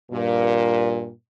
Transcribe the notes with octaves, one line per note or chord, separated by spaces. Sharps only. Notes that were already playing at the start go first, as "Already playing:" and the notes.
G2 A#2